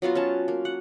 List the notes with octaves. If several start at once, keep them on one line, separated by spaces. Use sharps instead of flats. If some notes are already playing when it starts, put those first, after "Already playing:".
F#3 B3 F4 F#4
C#4 A5
A#3
F#5